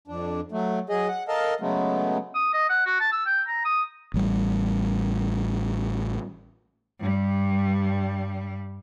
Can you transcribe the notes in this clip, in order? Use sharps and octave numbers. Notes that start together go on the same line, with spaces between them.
F2 D4
F#3 A3
F#3 G#4 D#5
F#5
A4 A#4 D#5 F5 A5
C#3 F#3 G#3 A3 B3
D#6
D#5
F#5
F#4
A5
E6
G5
A#5
D#6
A1 G3
G2 G3